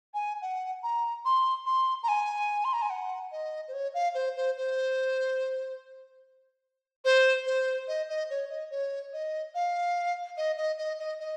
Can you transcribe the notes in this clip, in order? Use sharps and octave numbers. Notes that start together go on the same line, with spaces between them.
G#5
F#5
A#5
C6
C6
A#5
G#5
C6
A#5
G#5
F#5
D#5
C5
C#5
F5
C5
C5
C5
C5
C5
D#5
D#5
C#5
D#5
C#5
D#5
F5
D#5
D#5
D#5
D#5
D#5